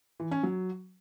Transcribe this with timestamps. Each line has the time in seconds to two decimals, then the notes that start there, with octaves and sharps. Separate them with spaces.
0.20 E3
0.31 C#4
0.43 F#3